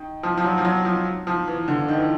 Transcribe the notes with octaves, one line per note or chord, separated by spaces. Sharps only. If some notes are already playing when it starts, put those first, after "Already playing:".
Already playing: D#3
F3
F3
F#3
F3
F#3
F3
F3
E3
D3
D#3
E3